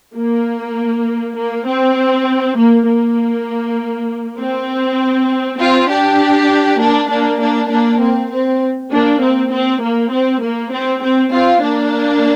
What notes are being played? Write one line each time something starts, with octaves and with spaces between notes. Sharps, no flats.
A#3
A#3
C4
A#3
A#3
C4
C4 F4
D4 G4
A#3 D4
A#3 D4
A#3 D4
A#3 D4
C4
C4
A#3 D4
C4
C4
A#3
C4
A#3
C4
C4
C4 F4
A#3 D4